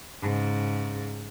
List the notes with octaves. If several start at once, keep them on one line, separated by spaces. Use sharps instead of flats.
G#2 C#3